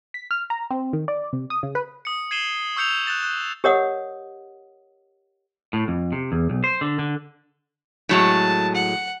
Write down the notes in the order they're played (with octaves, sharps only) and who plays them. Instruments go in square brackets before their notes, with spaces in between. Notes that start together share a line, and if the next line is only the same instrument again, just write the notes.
[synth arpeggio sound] B6
F6
A#5
C4
D#3
D5
C3
D#6
C#3
B4
[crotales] D#6 C#7
G#6 C7 D#7 E7 G7
C#6 E6 G6 C#7 F7
F#6 G6 A6 E7
F#6 G6
[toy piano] G4 A#4 C#5 D#5 F#5 D#6
[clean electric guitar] A2
F2
C3
E2
B1
C5
D3
D3
[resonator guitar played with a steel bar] A2 F#3 G#3 [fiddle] A5
[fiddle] F#5